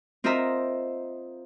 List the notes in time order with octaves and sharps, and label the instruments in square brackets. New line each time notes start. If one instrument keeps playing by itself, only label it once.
[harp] C4 F4 A#4 D#5 E5 A#5